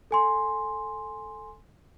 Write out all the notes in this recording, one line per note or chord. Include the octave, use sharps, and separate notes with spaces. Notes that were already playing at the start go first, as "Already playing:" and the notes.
A4 G#5 C6